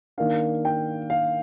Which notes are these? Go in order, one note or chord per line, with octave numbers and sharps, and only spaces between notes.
D#3 A#3 D4 F5
G5
F5